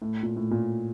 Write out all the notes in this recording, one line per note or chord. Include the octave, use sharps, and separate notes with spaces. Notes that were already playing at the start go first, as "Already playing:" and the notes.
A2
A#2
A2
A#2